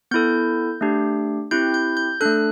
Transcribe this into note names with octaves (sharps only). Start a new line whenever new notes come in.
B3 E4 A4 G6
A3 D4 G4
C4 E4 G4 G6
G6
G6
A3 D4 A4 F#6